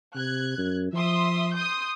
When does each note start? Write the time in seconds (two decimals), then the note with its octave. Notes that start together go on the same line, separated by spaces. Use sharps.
0.15 C3 F#6 G#6
0.58 F#2
0.93 F3 E5 C6 D#6
1.54 C6 D#6 G6